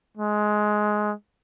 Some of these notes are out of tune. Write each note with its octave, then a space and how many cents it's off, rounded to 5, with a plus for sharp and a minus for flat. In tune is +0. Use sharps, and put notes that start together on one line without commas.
G#3 +15